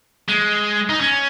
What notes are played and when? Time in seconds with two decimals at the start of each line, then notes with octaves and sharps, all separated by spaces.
0.29 G#3
0.90 D#4
1.00 C#4